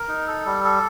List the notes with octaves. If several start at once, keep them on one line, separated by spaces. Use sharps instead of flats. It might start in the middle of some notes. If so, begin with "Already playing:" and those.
Already playing: A#4
D#4
A4
G3
A4